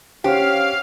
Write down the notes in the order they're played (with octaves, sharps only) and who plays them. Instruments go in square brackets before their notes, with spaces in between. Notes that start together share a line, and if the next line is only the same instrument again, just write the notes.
[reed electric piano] C#4 C5 F#5 [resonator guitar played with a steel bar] G4 [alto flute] C#5 [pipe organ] F5